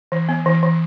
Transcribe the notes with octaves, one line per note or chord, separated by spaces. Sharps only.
E3
B3
E3
E3